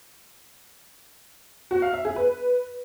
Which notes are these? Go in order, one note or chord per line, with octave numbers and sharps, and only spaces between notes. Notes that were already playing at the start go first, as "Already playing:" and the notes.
F#4
F5
E5
G#4
B4